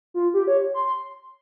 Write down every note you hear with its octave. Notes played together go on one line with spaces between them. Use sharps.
F4
G4
C#5
C6
C6